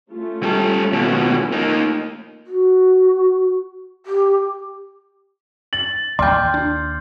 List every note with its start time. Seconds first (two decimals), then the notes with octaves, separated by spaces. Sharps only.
0.12 A3 C#4 F4
0.43 G3 A4
0.93 D#2 B2
1.52 A#3 D#4
2.45 F#4
4.06 G4
5.73 A6 F#7
6.19 D#2 D5 G5 C6 D6 F6 G6
6.54 D4